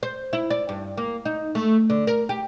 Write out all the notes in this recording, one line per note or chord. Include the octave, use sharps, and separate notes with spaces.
C5
E4
D5
G2
A#3
D#4
A3
D3
A#4
G4